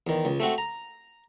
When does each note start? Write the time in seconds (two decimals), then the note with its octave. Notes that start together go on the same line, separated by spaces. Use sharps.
0.07 E2 D#3
0.25 C#2
0.40 A3 C4 F#4
0.58 A#5